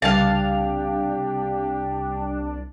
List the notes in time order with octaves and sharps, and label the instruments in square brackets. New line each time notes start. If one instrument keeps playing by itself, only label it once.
[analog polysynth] C2 D4 [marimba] C#3 G3 [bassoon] G4 [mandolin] F5 A5